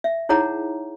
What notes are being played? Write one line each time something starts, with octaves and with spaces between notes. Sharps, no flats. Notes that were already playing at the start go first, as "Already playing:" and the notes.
E5
D#4 E4 G#4 C#5 F#5 A#5